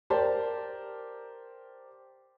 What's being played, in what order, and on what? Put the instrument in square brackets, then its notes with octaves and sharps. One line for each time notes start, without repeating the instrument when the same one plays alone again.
[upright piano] G4 A#4 C5 D5 A5